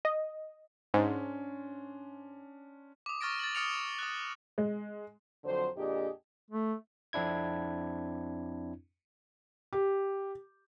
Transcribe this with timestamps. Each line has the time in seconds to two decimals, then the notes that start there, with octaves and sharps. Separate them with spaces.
0.05 D#5
0.94 G#2 C#4 D4 C6
3.06 D6 D#6
3.21 C#6 F6 A6 A#6 D7
3.39 A6 F#7
3.55 D#6 F6 A6 C#7 D7 F7
3.99 D#6 F#6
4.58 G#3
5.44 F2 D3 F#3 C5
5.76 F2 A#2 D4 G4 G#4 D#5
6.51 A3
7.13 F2 C4 D4 E4 G#6
9.73 G4